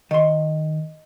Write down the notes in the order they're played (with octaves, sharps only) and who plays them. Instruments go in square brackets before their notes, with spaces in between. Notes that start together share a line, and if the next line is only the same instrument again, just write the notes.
[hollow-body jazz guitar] D#3 C6 [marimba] D#5